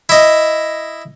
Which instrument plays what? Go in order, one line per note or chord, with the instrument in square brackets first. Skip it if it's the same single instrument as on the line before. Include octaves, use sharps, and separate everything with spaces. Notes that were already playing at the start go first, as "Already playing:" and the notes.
[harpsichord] E4 D#5